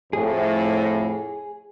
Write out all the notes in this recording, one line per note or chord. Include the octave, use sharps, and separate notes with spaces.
F2 A2 G#4